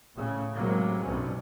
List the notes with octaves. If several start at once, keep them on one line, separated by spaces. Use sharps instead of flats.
A2 C#3
A2 C3 F#3 G#3 A#3
B1 G2 C3 C#4